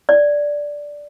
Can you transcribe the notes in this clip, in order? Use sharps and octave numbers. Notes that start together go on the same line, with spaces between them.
D5